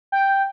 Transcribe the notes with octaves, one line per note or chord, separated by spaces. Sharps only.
G5